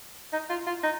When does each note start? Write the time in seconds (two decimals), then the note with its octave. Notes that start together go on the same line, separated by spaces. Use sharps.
0.33 D#4
0.49 F4
0.67 F4
0.83 D#4